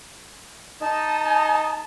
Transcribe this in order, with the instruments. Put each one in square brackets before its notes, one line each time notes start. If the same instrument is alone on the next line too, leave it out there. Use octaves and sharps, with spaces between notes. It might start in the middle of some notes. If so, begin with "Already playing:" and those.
[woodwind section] D#4 [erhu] A5